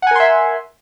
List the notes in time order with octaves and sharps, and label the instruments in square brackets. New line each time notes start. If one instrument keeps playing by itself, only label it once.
[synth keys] F#5
G#5
A#4
C6
E5